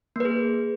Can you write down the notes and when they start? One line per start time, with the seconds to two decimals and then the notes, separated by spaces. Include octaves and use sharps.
0.16 A#3
0.20 B4
0.25 G#4